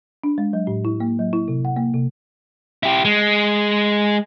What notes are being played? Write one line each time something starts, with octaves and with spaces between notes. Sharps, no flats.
D4
G#3
F#3
A2
E4
A#3
F#3
E4
C3
F#5
A#3
C3
E4 G4
G#3